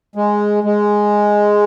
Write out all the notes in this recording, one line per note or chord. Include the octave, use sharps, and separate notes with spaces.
G#3
G#3